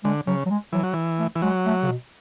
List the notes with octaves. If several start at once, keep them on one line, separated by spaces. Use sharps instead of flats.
D3 G#3
C#3 F#3
F#3
G#3
E3 F#3
F#3
E3
A3
E3
F#3 G#3
A3
C#3
B2